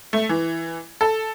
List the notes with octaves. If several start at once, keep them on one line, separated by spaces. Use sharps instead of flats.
A3
E3
A4